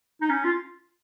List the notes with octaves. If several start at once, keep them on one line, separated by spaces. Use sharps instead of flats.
D#4
C#4
F4